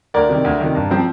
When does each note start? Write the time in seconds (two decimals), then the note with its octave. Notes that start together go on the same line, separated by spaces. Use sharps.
0.14 D2 A#4 D5
0.29 C3 D#3
0.44 D2
0.60 C3 D#3
0.75 G2
0.90 F3 C4